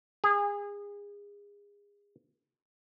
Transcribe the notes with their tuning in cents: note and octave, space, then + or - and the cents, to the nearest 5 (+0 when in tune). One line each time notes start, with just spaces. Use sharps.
G#4 -30